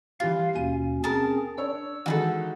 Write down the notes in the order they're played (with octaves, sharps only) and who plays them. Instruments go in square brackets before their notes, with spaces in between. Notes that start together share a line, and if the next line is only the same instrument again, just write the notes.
[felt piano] E3 G3 [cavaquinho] F4 [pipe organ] F5
[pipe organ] D#2 B2 C#4 [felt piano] D#7
[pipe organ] C4 C#4 G#4 [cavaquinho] A#4 A5
[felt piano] D4 C#5 [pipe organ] E6
[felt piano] D#3 E3 G#3 [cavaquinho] F#4 G#4 A4